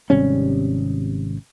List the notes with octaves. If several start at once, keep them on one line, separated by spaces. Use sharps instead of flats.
G#1 C3 G3 C#4